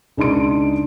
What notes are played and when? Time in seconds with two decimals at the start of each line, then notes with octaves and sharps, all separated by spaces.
0.17 C#2 D4 D#4 C6 D7